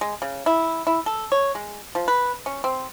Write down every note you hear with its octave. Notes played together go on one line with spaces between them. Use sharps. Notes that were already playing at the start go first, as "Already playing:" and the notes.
G#3
C#3
E4
E4
A4
C#5
G#3
F3
B4
C#4
C4